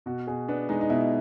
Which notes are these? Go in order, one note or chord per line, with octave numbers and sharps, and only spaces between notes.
B2 F#4
B2 G#4
B3 D4
G#3 D#4
D#4
B2 E4